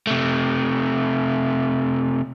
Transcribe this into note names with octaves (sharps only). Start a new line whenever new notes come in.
C3 A3